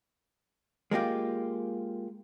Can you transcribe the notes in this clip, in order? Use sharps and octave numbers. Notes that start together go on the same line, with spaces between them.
G#3 A#3 F4 G4